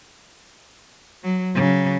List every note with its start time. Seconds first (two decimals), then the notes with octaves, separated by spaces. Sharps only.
1.23 F#3
1.55 C#3 F#3